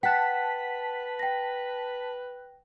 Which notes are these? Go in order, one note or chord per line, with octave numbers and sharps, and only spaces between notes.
B4 F#5 G5 A5 F#6 B6
G5 A#6